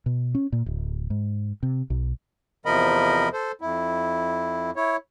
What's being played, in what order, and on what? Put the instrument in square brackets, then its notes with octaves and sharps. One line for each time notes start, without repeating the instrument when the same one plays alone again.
[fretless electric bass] B2
C#4
A#2
D1
G#2
C3
B1
[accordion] E2 C3 F3 A#4 D#5 B5
A4 C5
F2 E4
E4 C#5